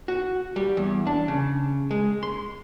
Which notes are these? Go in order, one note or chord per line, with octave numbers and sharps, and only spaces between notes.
F#4
G3
E2
D4
C#3
G#3
C6